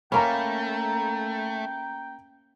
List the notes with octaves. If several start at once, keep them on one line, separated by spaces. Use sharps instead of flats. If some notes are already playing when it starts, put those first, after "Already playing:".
A3 A#3 C#4 G5 A#5 B5